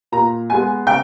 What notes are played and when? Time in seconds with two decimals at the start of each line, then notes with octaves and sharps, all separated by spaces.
0.12 A#2 A#5
0.50 G#3 B3 G#5
0.87 C#3 G5